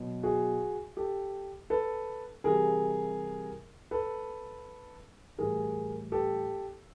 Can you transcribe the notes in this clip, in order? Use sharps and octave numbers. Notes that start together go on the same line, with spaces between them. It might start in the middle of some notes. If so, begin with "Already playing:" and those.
Already playing: B2 F#3
F#4 G#4
G4 A4
A4 B4
C3 E3 G3 G#4 A#4
A4 B4
A2 E3 G3 G#4 A#4
G4 A4